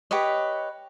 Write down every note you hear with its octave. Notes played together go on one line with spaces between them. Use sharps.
G4 B4 C#5 D#5